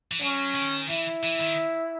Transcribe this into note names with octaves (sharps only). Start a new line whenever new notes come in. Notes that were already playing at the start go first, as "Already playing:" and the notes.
E3
F#3 C#4
D#3
E3 E4
E3
D#3